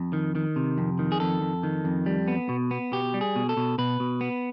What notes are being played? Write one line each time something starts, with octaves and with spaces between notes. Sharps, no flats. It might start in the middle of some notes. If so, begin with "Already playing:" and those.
Already playing: F2
D#3
D#3
C3
F2
D#3
G#4
F2 A4
F2
D#3
F2
G3
B3
B2
B3
B2 G4
G3
G#4
B2
A4
B2
B2 B4
B2
B3